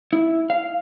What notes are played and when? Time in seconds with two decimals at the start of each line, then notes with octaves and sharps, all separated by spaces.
0.13 E4
0.50 F5